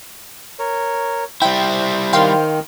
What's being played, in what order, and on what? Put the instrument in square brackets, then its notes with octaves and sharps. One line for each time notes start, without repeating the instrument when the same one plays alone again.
[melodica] A#4 C#5
[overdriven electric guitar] G3 E4 [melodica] C5 [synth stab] G5
[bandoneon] D#3 [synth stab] F5 G5 C6